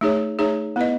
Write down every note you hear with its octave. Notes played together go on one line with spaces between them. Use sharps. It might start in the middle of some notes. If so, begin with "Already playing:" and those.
A3 D#4 G#4 C#5
A3 D#4 G#4 C#5
B3 E4 B4 D#5